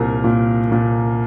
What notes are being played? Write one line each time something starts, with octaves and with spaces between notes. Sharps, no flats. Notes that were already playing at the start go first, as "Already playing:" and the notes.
Already playing: C2 A#2 A#4
A#2
A#2